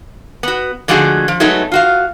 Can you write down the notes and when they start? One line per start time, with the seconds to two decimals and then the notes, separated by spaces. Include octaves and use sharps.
0.43 B3 F#4
0.88 D3 F3 G#3 A3 F#4 G#4
1.28 F3
1.40 F#3 G#3 A3 B3 D#4
1.72 F4 F#4 F5